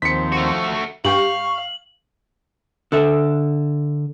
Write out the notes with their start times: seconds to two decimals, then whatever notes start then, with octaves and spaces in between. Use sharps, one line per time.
0.02 D#2 F3 C4 B6 C#7
0.32 A3 F#4
1.05 G2 G4 F5 G5 C#6 F#7
2.92 D3 A4 E5